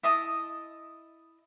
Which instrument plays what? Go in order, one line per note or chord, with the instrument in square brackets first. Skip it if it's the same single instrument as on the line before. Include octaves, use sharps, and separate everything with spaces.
[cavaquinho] E4 D#5 A5 D#6